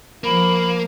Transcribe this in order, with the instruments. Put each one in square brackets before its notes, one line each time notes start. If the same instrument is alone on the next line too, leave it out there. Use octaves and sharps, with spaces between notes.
[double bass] F3 [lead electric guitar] A#3 [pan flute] B5